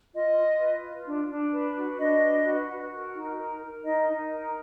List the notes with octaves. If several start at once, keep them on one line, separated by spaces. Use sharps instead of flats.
F4 D#5
F4
B4
F4
D4
D4
B4
F#4
D4 D#5
B4
F#4
F#4
A#4
D#4
A#4
A#4
D#4 D#5
D#4
A#4